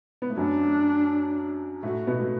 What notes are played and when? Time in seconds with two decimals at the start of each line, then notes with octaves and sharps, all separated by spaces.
0.22 B3
0.30 A3
0.37 F#2 F#3 D4
1.83 A2 A3 F#4
2.07 B2 B3
2.20 A3